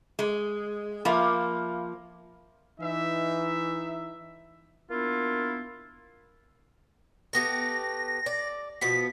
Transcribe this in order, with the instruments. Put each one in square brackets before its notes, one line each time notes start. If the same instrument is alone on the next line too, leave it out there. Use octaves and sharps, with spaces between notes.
[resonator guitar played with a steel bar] G#3
[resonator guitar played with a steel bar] F3 A#3 [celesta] E5 F5 B5
[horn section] E3 D#4 E5
[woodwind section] A#3 B3 D4 E4 F4
[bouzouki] A3 B3 G4 [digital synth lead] A#6
[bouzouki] D5
[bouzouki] B2 F3 B3 [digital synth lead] B6